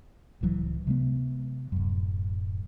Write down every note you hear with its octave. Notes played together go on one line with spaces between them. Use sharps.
D1 C#2 E3 F#3
C3 G#3 B3
D1 F#2